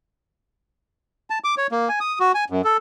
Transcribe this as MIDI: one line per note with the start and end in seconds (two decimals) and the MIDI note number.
1.30 1.39 81
1.44 1.55 86
1.58 1.67 73
1.72 1.89 58
1.89 1.99 80
2.00 2.19 87
2.20 2.32 66
2.34 2.44 80
2.50 2.62 42
2.64 2.77 69